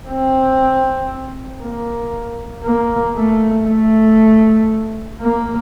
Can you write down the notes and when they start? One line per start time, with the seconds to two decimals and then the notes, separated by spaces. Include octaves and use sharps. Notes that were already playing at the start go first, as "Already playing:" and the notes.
0.08 C4
1.62 A#3
2.64 A#3
3.16 A3
3.66 A3
5.21 A#3